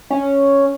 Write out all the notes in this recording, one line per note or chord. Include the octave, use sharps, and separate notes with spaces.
C#4